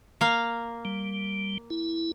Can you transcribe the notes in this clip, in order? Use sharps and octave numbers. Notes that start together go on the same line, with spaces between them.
A#3 F5
G3
E4